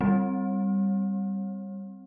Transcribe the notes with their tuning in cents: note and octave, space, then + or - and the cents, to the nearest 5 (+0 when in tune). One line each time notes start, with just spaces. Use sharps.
G3 +0 C4 -10